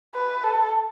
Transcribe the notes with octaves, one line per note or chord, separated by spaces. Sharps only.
B4
A4